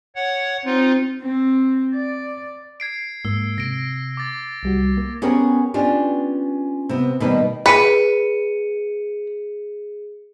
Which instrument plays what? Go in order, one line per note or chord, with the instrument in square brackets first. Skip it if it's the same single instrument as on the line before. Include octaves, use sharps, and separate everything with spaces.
[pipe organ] C#5 F#5
[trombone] C4 [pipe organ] D#4 F4
[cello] C4
D5
[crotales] G#6 C7 D7
[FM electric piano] G#2 A#3 [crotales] E6
[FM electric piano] C3 [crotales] A#6 D7
[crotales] D6 A6
[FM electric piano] C2 G3 F#4
A#3
[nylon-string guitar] B3 C#4 G4 G#4 A#4 C#5
B3 C#4 D4 F4 G4
C3 B3
B2 D#3 G3 A#3 B4
[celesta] G#4 C#7 D#7 [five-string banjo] B4